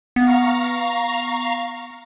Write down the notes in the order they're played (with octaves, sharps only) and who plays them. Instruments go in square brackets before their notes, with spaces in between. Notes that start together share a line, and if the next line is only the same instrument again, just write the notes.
[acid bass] B3 [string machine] F5 A#5 C#6